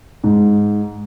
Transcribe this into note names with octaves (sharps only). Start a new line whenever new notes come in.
G#2